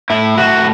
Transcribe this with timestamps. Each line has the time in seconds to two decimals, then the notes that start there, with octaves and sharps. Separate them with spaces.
0.10 A2 E4
0.38 A2 F#4